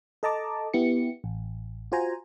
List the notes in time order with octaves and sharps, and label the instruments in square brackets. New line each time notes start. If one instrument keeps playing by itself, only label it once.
[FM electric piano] A4 D#5 A5 A#5 D6
B3 E4 G4 C#7
A1
F4 F#4 C5 G#5 A#5